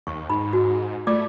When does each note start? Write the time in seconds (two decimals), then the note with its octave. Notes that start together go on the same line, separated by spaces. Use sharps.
0.07 D#2 C#6
0.29 G#2 D#4 B5
0.53 F#4
1.07 A3 F4 D5 D6